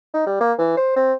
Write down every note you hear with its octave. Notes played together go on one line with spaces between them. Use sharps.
D#4
G3
A#3
E3
C5
C4